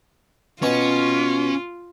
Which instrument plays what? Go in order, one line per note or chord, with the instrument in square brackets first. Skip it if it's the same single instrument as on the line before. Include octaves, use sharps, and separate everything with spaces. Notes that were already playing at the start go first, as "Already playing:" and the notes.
[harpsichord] B2 C#6 [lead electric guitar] C#4 [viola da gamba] F4